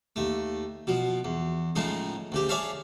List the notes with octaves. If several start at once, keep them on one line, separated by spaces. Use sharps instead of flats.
D#2 A3
B2 F3
E2
A2 C#3 F3 G#3 D#4
D2 C#3 G4
G#4 C#5 D5 E5 F5 A5